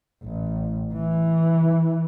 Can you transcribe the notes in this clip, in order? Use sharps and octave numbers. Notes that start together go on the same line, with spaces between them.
A1
E3